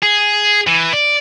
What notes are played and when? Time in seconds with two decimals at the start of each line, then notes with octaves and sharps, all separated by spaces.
0.02 G#4
0.67 E3
0.93 D5